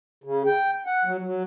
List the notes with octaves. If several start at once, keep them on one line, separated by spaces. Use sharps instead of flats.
C#3
G5
F#5
F#3
F#3